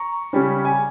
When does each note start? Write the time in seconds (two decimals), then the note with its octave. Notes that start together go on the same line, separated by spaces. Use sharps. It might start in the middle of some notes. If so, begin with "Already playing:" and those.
Already playing: A#5 C#6
0.33 C#3 G3 C#4
0.65 G#5